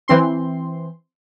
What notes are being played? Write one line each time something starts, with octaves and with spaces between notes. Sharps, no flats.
E3 C4 C6